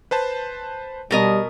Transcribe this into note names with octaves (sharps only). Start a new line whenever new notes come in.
B4 C5 A5
B2 G3 A#4 D#5